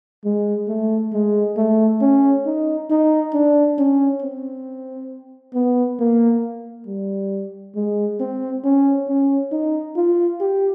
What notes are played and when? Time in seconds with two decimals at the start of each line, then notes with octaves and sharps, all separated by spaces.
0.25 G#3
0.68 A3
1.13 G#3
1.57 A3
2.01 C#4
2.46 D#4
2.90 D#4
3.34 D4
3.78 C#4
4.22 C4
5.54 B3
5.99 A#3
6.87 G3
7.76 G#3
8.20 C4
8.64 C#4
9.09 C#4
9.52 D#4
9.96 F4
10.41 G4